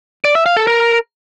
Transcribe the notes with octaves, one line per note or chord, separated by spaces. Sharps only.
D5
E5
F5
A4
A#4